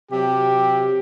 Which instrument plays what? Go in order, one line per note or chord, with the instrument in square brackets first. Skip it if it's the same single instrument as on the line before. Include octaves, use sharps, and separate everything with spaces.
[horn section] C3 F#3 G4